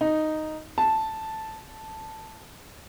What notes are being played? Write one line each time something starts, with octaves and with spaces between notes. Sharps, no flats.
D#4
A5